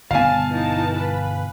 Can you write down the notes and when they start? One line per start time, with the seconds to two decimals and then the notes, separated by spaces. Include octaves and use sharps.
0.11 G1 B2 B3 F5 G#5 A5
0.50 E3 D#4 A5
0.96 B4